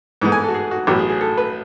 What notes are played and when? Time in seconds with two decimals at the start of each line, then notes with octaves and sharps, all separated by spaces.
0.21 G#2 E3 G#3 B3
0.32 G#5
0.44 A4
0.48 F#4
0.54 G#4
0.71 F#4
0.87 A1 A2 F#3 B3
0.99 G#4
1.09 G#4
1.21 A4
1.37 B4